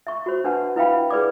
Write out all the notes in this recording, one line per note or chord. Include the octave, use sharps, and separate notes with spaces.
E5 C#6
F#4 C5
D4 B4 F#5 A5
E4 B4 E5 F5 G5 B5
G#4 B4 D5 D6